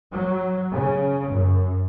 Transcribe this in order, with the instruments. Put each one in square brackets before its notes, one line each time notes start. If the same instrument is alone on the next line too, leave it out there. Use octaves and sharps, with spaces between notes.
[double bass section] F#3
C#3
F#2